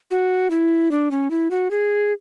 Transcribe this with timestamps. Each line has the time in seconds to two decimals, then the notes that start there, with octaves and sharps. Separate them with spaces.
0.11 F#4
0.50 E4
0.91 D4
1.11 C#4
1.31 E4
1.51 F#4
1.71 G#4